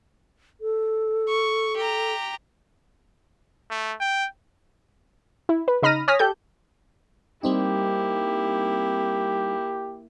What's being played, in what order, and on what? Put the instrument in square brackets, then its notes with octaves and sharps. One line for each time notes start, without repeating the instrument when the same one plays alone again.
[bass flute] A4
[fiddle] C#6
G4 A#5
[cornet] A3
G5
[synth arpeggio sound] E4
B4
C#3 D#4 B5 F6 A#6 D#7
C#5 G#5 D#6 F6 A#6 B6
G4 A4 G6
[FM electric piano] G3 C4 D#4 [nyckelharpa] A#3 E4 [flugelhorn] G4